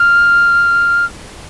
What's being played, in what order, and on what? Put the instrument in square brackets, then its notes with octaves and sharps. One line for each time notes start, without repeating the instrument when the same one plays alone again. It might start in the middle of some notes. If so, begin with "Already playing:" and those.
Already playing: [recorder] F6